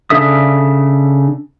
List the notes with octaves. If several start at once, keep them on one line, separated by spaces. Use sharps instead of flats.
C#3 D4 A4 E5 D#6